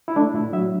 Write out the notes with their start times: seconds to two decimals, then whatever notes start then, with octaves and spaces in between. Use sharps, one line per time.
0.08 E4
0.16 A3 D4
0.34 A2 E4
0.53 F#3 E5